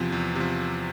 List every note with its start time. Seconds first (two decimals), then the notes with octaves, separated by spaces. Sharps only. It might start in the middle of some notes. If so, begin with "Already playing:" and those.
Already playing: E2 C3 F3
0.12 E2
0.35 C3 F3